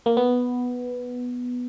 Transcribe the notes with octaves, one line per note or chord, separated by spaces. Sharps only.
A#3
B3